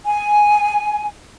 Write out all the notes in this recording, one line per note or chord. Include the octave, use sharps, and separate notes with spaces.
G#5